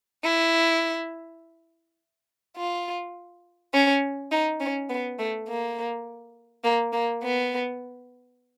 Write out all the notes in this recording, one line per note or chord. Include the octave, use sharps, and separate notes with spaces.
E4
F4
C#4
D#4
C#4
B3
A3
A#3
A#3
A#3
B3